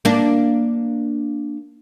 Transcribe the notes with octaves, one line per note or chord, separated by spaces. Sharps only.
A#3 D4